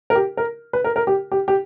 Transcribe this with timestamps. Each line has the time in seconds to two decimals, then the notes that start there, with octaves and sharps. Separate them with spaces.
0.10 A#4
0.15 G4
0.37 A#4
0.73 B4
0.84 A#4
0.96 A#4
1.07 G4
1.32 G4
1.48 G4